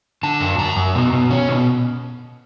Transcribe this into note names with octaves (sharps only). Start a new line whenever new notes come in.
D3 A5
F#2
F#2 A#5
F#2
B2
B2
C#4
B2